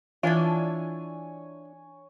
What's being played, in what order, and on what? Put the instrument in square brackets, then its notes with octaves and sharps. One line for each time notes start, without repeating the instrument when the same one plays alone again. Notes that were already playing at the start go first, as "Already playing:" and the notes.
[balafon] E3 [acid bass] D4 [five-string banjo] E4 F4 [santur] C#5 G#5